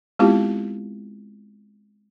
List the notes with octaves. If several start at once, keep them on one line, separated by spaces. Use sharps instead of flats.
G#3 B3 C4 E4 F4 G4